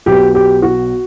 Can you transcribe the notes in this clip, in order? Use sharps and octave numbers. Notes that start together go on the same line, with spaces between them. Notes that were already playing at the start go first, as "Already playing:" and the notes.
B1 B2 F#3 G4
G4
F#4